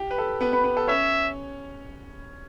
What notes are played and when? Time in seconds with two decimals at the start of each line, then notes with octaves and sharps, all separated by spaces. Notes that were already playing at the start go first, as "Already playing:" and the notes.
Already playing: G4
0.11 B4
0.18 A4
0.41 B3 B4
0.53 B3 B4
0.64 B3 B4
0.77 A4
0.88 C#4 C#5 E5